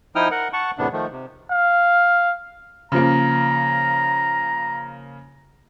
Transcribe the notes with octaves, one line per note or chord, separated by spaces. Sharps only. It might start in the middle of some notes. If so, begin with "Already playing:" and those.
F3 D#4 E4 G5 D#6 F6
A#4 F#5
F#5 A5 C#6
E2 A2 C3 B3 D4
D#3 F3 A3
C3
F5
C#3 F3 A#3 A#5